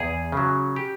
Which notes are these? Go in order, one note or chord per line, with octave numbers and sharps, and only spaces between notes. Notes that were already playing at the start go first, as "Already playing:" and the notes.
Already playing: E2 G#4
C#3 F#3
G4